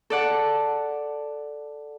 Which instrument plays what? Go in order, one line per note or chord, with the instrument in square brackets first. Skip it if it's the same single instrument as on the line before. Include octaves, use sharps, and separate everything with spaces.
[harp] A4 D5 F#5